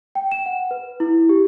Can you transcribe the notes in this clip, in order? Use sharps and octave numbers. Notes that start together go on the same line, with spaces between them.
G5
E7
F#5
B4
E4
G4